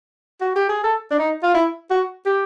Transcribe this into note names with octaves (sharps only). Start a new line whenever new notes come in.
F#4
G4
G#4
A4
D4
D#4
F4
E4
F#4
G4